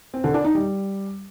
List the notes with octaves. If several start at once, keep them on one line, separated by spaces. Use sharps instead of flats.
C4
D3
D4
D#4
G3